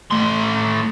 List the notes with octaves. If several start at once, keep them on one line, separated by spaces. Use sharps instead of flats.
A2 C6